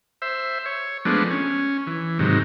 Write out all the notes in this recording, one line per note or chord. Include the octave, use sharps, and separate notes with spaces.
C5 E5
C#5
F3 G#3 A3 B3 D4
C#4
E3
G#2 C3 D#3 F#3